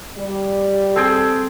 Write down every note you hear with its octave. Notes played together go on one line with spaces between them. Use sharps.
G3
C4 G#4 A4 G5